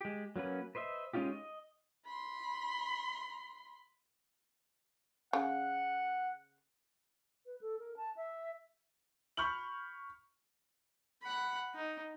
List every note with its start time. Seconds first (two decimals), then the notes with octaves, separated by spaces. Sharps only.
0.01 G#3 G4
0.36 F#3 A#3 C#4 B4
0.75 B4 C5 D#5 E5
1.14 G#3 C#4 D#4 F4 G4
1.32 D#5
2.05 B5 C6
5.33 C#3 F#5
7.46 B4
7.61 A4
7.79 A#4
7.97 A5
8.16 E5
9.37 B5 C#6 F6 G6 F#7
11.23 F#5 B5
11.74 D#4